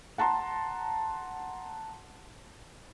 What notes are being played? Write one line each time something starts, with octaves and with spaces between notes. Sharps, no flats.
F#5 A5 A#5 C6